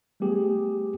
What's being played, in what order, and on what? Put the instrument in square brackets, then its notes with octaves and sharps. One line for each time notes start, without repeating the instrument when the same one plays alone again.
[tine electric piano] G3 A3 B3 G4 G#4